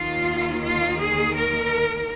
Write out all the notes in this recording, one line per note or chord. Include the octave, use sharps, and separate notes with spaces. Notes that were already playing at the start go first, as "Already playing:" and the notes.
Already playing: D#2 D#3 F4
F4
G#4
A#4